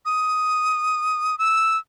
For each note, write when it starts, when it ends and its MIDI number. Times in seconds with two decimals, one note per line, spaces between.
0.05 1.38 87
1.39 1.77 88